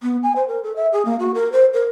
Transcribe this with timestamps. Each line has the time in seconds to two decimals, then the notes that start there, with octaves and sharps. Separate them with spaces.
0.03 B3
0.23 G#5
0.36 C5
0.48 A#4
0.64 A4
0.76 E5
0.93 G#4
1.05 A#3
1.19 F#4
1.34 A#4
1.52 C5
1.74 A#4